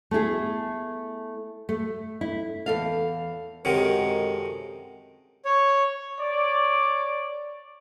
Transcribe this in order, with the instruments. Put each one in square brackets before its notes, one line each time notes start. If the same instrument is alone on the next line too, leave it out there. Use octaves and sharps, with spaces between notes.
[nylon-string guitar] A3 B3 E4 G#4
A3
E4
E2 A4 F5
[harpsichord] F#2 C3 D#3 [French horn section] G#3 A4 A#4
[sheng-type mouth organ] C#5
[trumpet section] C#5 D5